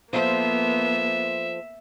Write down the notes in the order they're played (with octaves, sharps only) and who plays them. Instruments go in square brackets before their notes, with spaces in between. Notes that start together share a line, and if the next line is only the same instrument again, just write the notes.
[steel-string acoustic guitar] F3 A4 C5 [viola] A#3 B3 [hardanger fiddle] E5